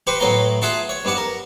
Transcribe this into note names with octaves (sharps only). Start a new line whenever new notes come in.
G4 B4 C5 C#6
A2 F#3 B3 F5 A#5 C6
F4 G#4 E5 F#5 A5 C6
C#5
G2 B3 D4 F#5
A#4